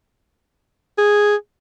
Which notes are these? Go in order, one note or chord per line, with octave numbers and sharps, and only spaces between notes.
G#4